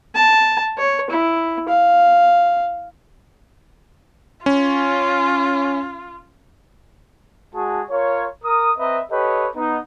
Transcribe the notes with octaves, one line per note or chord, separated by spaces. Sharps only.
A5
C#5
E4
F5
C#4 F4
G#3 F#4 G#4 A5
F4 A#4 C#5
A#4 D#6
C4 B4 D#5 E5 A#5
G4 A4 B4 C#5 D#5
B3 D#4